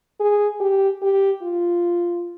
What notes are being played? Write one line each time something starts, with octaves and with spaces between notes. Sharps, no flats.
G#4
G4
G4
F4